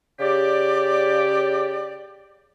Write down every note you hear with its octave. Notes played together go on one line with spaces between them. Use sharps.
C#3 G4 D5